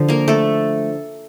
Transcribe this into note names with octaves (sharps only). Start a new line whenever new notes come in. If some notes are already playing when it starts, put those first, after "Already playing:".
Already playing: D3 F3
A#3 A#4
A3 A4